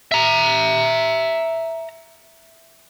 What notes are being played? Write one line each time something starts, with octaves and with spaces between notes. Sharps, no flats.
E5 A#5